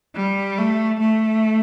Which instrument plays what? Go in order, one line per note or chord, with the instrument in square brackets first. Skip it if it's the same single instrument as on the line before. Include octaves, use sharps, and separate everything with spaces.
[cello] G3
A3
A3